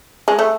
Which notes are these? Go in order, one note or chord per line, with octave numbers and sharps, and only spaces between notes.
G#3
A3